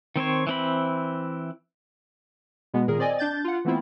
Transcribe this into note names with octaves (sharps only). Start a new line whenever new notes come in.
D#3 C4 C5 C#5
E3 C4 B5
B2 G#3 B3
A#2 D#3 G#4 A#4
C4 D5 D#5 G#5
D4 G6 A6
F4 F#5
E3 A3 B3 C4 E4 F4